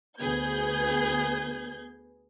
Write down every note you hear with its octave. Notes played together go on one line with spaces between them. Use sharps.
D2 B3 G#4 G6 G#6